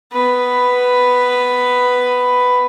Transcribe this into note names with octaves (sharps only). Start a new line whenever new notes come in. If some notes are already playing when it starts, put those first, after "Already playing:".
B3 B4